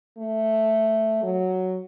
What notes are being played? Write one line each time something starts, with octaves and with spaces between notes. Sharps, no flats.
A3
F#3